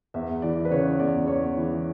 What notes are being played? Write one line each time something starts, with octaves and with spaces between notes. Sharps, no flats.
E2 E5
E3 D5
B4
C#3 C#5
E2 D5
E2 C#5
E3